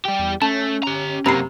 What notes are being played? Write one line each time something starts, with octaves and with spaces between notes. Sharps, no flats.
G3 G4
E2
A3 C#4 A5
G4 A#5
F#2 C3 A#3 A#5 B5 C7